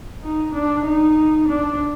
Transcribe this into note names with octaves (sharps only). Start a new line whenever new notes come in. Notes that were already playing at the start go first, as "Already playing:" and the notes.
D#4
D4
D#4
D4